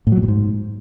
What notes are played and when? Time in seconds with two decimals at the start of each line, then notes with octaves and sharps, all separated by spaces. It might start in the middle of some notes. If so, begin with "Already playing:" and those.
0.07 A2
0.12 F#3
0.17 A#2
0.23 A2
0.28 G#2